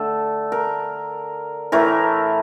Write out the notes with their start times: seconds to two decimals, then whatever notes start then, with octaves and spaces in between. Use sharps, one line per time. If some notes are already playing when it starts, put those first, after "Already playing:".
Already playing: D3 A3 A4
0.52 A#4
1.72 A2 E3 A3 A#4